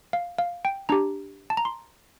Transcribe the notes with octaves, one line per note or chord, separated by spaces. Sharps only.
F5
F5
G5
D4 G4 A#5
A5
A#5
C6